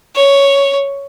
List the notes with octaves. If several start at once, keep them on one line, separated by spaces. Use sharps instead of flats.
C#5